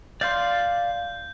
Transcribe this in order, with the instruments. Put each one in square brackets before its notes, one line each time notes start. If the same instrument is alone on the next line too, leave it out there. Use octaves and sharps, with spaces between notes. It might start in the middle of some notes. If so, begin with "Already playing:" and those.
[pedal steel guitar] D5 F5 C6 [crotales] G6